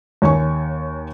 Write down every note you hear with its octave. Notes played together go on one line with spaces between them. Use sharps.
D#2 C#5 G#5 C#6